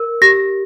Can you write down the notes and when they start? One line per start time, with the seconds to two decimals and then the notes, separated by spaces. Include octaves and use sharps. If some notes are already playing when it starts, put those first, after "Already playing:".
Already playing: A#4
0.22 G4 A#6